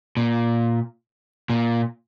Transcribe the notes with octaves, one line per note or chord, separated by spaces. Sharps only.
A#2
A#2